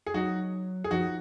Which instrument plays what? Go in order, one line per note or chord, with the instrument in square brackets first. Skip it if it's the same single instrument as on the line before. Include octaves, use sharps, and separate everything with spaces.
[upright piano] G#4
[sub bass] F#3 [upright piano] D#4 F#4
[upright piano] G#4
[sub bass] F3 [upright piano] D#4 F#4